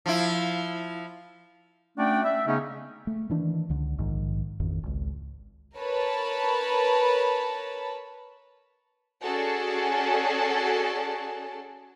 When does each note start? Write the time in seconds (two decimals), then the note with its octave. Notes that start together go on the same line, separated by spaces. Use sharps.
0.06 F3 E4
1.97 A3 C#4 D4 F#4 D5 G5
2.24 E5
2.47 C#3 A3 B3 C#4 D#4
3.07 A3
3.29 D#3 E3 D4
3.69 C#2 D3
3.98 A#1 G#2 D#3
4.60 A1 F2 D#3
4.83 G#1 C#2
5.76 A#4 B4 C#5 A5 B5
9.23 C#4 F#4 G#4 A4 D5 A5